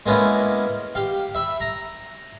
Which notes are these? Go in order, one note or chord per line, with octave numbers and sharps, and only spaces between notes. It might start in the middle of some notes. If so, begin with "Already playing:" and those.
G#3 A#3 B3 C#4 E4
G4 F5
E5 B5
A#5